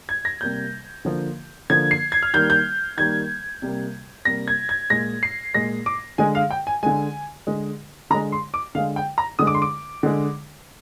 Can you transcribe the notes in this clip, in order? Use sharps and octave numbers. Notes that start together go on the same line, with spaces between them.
G#6
A#6
C3 G3 A#3 G6
D3 F3 A#3
D3 F3 A#3 G#6
C7
G#6
F6
D#3 G3 A#3 G6
G6
D#3 G3 A#3 G#6
C3 G3 A#3
C3 G3 A#3 A#6
G#6
G#6
A#2 G#3 A#6
C7
A#2 G#3 A#6
D6
D3 G#3 G#5
F5
G5
G#5
D3 G#3 G#5
D3 G#3
D3 G#3 A#5
C6
D6
D3 G#3 F5
G5
A#5
D3 G#3 D#6
D6
C6
D6
D3 G#3